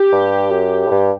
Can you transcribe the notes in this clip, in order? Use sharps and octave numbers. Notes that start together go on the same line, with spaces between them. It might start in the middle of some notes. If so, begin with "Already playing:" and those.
Already playing: G4
G2
F#2
A2
G2